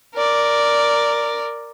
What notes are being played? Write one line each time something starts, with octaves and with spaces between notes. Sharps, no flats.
A#4 D5